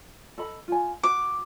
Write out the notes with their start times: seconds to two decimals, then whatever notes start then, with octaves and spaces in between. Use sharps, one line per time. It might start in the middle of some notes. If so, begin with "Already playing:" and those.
0.38 A4 D#5 B5
0.68 F4 G#5
1.03 F#4 D6